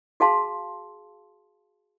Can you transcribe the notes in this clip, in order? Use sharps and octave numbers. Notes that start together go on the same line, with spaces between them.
F#4 G#4 F5 A5 C6